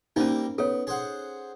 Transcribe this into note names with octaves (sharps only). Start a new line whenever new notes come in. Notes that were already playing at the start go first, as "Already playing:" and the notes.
G3 A#3 C4 C#4 D#4
B3 A4 C#5
G#4 C5 F#5